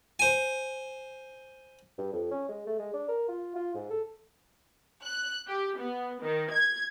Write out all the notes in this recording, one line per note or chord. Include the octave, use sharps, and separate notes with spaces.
C5 G#5
G2
F2
C#4
G#3
A3
G#3
D4
A#4
F4
F4
G#2
A4
F#6
G4
B3
D#3
G#6